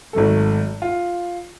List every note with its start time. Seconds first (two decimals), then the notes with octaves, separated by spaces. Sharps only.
0.13 G#1 F#3 A3 A4
0.82 F4